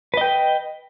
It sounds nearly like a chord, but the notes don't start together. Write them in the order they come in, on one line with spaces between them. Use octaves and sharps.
B4 D#5 G5